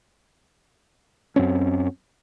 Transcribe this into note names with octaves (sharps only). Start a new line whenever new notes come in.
F#2 C4 C#4